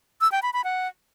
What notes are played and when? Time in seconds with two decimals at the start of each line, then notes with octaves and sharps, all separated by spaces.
0.21 E6
0.32 G5
0.43 B5
0.53 B5
0.64 F#5